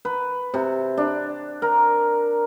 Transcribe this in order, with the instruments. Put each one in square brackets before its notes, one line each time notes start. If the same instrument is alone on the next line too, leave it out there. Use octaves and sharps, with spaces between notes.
[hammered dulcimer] B4
C3
D4
A#4